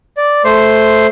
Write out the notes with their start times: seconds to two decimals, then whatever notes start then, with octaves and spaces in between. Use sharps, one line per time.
0.17 D5
0.45 A3 C5 C6